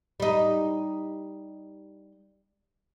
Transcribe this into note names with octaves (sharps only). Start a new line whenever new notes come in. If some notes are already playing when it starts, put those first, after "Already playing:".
G3 D#4